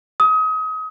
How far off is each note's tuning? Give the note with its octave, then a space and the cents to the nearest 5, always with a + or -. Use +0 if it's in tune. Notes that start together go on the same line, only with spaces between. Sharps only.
D#6 +30